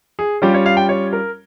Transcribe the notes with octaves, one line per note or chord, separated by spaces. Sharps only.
G#4
G3 C#4 F4 G4
C#5
F5
G5
C#5
A#4